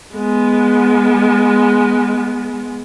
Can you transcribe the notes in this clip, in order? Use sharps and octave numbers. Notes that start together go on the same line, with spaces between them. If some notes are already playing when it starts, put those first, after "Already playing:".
G#3 B3